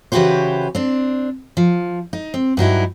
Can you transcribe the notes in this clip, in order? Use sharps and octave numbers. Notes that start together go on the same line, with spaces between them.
C#3 E3 F#4 G4 B4 C5
C4 D4
F3
D#4
C4
G2 F#3 D#4 E4